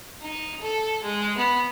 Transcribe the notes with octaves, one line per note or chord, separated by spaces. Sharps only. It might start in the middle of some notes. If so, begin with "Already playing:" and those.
D#4
A4
G#3
B3